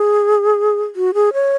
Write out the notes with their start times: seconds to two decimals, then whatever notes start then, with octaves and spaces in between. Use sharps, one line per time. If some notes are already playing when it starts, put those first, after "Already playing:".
Already playing: G#4
0.96 F#4
1.14 G#4
1.33 C#5